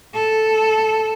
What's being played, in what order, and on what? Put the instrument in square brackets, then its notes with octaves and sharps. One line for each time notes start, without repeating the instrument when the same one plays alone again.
[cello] A4